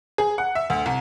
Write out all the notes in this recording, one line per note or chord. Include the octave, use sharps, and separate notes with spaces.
G#4
F#5
E5
D2
C2